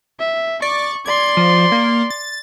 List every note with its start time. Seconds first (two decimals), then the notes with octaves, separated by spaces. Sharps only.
0.19 E5
0.62 D5 C#6
1.06 D5 C6 G#6
1.37 F3
1.72 A#3
2.10 A6